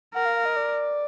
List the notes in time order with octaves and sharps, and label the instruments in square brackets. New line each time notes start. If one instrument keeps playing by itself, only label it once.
[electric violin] A#4 [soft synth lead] F#5
[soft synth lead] F5
F5
D#5
D5